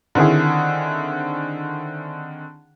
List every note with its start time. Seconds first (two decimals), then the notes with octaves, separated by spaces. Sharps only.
0.15 D3 D#3 C4 E4 G#4